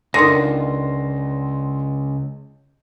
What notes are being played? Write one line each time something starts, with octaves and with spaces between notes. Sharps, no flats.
C#2 D3 D#3 C6 A#6